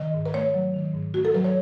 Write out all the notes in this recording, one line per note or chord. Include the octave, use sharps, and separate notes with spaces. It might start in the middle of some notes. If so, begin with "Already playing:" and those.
Already playing: D#3 D#5
G#2
B4
A3 C#5
F#3
D#3
G#2
A3 F#4
A4
F#3 B4
C#5